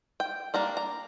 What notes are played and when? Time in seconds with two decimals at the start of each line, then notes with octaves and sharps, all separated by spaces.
0.20 G5
0.54 G3 A#3 D4 A#5
0.77 A#5